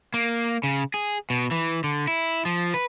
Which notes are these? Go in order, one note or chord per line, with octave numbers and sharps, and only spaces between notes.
A#3
C#3
G#4
B2
E3
D3
E4
F3
B4